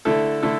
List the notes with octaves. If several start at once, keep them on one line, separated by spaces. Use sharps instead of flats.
D3 A3 E4 A4
D3 A3 E4 A4